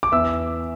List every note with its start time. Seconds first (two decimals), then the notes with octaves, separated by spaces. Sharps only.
0.03 D6
0.12 E2 E5 E6